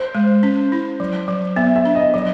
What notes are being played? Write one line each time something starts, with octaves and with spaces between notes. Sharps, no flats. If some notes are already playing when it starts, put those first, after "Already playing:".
Already playing: C5
G#3
C#4
E4
F#3
F#3
B3 E5
E5
D4
D#5
F#3 D#5